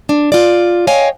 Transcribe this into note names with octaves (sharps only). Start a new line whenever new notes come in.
D4
F4 D5
C#5 D#5 F5 G5 G#5